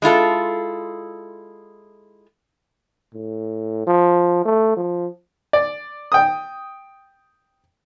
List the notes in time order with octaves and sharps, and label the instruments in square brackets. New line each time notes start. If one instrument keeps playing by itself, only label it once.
[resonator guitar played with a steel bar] G#3 E4 F4 A4
[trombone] A2
F3
A3
F3
[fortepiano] D5
G5 D#6